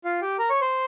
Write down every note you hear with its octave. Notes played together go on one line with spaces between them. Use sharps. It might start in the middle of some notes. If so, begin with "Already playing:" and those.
F4 F5
G4 G5
A#4 A#5
C#5 C#6
C5 C6